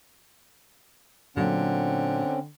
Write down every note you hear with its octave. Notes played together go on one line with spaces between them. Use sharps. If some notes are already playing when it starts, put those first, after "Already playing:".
A#2 D3 F#3 A3 C4 C#4